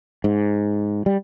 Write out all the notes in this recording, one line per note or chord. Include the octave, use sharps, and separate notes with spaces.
G#2
G3